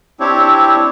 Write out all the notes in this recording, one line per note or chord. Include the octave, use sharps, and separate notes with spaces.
C4 D4 E4 G4 C#5